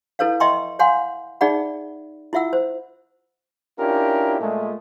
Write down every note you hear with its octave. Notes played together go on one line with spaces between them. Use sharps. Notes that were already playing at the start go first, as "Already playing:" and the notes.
E4 A4 B4 C#5 F5
D#5 E5 G5 A#5 C6 C#6
C#5 F5 F#5 G#5 C6
D#4 G#4 D5 E5 F#5 B5
E4 F4 E5 F#5 E6
C5
C#4 D4 E4 F4 G4 A#4
A#2 G#3 A3